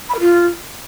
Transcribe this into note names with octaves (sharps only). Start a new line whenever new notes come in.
B5
A#4
F4